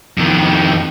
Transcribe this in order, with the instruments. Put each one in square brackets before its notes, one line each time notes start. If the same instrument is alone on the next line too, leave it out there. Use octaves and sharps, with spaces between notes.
[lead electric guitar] F2 D#3